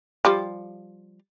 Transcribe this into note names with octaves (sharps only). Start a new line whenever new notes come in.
F3 G3 F4